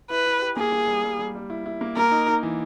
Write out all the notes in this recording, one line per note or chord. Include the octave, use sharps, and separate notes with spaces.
E4 B4
E4
G4
A#3 G#4
A#3
G3
G3
G3
G3
E4
E4
A#3
A#3 A#4
D#4
D#4
E3